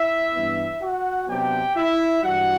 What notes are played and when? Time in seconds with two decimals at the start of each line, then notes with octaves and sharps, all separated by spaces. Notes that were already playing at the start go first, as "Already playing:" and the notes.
Already playing: E4 E5
0.33 G2 E3 B3
0.80 F#4 F#5
1.28 C3 F#3 B3 D4 G4 G5
1.76 E4 E5
2.23 G2 E3 G3 F#4 F#5